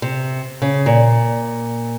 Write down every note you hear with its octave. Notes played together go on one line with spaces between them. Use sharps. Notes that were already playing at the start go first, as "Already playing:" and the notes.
C3
C#3
A#2